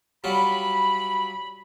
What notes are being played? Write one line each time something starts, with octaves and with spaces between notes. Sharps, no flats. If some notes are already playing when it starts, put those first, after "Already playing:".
F#3 G3 F4 B5